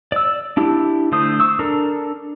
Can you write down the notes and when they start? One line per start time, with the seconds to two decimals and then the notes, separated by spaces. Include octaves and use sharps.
0.12 D5 E6
0.57 D4 E4 G4
1.12 D3 A3 C5 D#6
1.40 C#6 E6
1.59 D4 A4 A#4